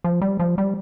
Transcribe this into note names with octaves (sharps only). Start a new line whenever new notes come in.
F3
G3
F3
G3